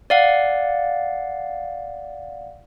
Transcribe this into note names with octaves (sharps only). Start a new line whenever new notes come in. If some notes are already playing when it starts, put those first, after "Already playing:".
D5 F5 F#5